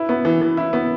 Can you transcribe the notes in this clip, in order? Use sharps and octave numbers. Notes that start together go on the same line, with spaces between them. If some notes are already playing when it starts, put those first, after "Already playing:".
Already playing: E4 B4
B3
E3
E3
E4
B3